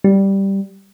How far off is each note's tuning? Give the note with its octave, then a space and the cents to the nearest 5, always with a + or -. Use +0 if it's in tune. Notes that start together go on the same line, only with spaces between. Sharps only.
G3 -5